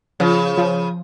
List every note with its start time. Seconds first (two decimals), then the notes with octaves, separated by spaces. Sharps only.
0.20 C#3 F3
0.58 F3